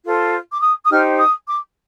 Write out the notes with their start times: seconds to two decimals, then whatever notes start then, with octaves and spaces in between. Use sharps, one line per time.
0.04 F4 A4 C5
0.51 D6
0.61 D#6
0.85 D#6
0.90 D#4 G4 C5 F6
1.19 D#6
1.47 D6